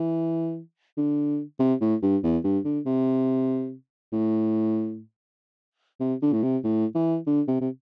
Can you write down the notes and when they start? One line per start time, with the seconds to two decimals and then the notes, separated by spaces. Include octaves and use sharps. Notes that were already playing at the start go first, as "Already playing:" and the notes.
Already playing: E3
0.97 D3
1.60 C3
1.81 A2
2.02 G2
2.24 E2
2.44 G2
2.65 D3
2.86 C3
4.13 A2
6.00 C3
6.22 D3
6.33 A2
6.43 C3
6.64 A2
6.95 E3
7.27 D3
7.48 C3
7.61 C3